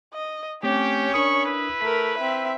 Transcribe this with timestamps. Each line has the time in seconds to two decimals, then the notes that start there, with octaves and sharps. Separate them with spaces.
0.14 D#5
0.63 A3 C4 C#4 G4 C#5
1.14 D4 A#4 B5 C#6 D#6
1.46 E4 B4
1.81 A3 A#4 B6
2.17 C4 E5